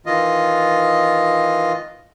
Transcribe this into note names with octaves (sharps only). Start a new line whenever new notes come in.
D#3 E3 F4 D#5